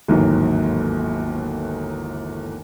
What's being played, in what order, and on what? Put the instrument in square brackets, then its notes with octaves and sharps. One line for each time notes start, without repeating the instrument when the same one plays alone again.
[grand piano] G1 D#2 G#2 E3 F#3